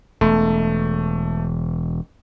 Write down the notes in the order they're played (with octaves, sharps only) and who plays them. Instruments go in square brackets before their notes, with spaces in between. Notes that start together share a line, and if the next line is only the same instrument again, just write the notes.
[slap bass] E1 [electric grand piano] A3